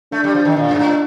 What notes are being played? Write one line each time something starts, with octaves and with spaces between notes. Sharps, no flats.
A3 D4
G3
F3
D#3
A#2 D4
G2
A2